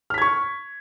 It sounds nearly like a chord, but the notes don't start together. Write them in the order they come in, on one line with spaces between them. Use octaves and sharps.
F6 B6 G#6 C#6